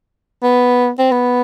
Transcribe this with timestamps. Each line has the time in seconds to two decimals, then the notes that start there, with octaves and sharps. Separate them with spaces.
0.43 B3
0.99 C4
1.11 B3